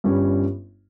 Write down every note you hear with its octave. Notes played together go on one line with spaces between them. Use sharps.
G1 G2 G3 C#4